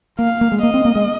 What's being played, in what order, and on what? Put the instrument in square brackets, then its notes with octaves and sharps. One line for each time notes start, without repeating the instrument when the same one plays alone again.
[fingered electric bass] A#3 [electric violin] F5
[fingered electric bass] A#3
G#3
[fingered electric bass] A#3 [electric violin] D#5
[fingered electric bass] C4
A#3
G#3